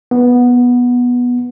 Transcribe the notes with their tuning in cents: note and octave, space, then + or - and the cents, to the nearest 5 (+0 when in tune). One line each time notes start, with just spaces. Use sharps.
B3 -10